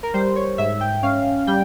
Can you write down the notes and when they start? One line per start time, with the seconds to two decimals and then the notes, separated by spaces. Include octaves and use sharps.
0.03 A#4
0.14 G3 C5
0.36 C#5
0.58 G#2 E5
0.81 G5
1.03 C#4 F5
1.47 G3 G5